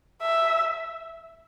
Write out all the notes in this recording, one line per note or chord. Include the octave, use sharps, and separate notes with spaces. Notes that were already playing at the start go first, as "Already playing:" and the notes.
E5